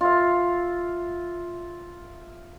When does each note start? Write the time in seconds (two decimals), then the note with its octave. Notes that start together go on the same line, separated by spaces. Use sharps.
0.01 F4 E5